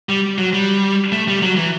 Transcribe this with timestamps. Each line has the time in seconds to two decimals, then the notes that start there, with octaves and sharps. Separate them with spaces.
0.09 G3
0.38 F#3
0.53 G3
1.12 A3
1.28 G3
1.42 F#3
1.57 E3